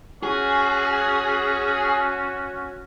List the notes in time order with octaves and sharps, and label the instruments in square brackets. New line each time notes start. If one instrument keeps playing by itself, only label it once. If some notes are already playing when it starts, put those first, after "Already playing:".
[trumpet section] C#4 F#4 [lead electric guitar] G#4